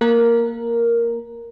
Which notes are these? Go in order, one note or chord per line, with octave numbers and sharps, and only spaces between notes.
A#3 A#4